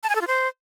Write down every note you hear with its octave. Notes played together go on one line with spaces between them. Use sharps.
A5
G#5
A4
F4
C5